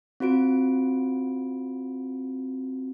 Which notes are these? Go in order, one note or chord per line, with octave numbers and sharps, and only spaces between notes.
C4 F4 F#4 D7